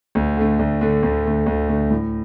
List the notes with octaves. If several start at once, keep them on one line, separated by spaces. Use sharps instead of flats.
D2
D3 A3
D2
D3 A3
D2
D3 A3
D2
D3 A3
A2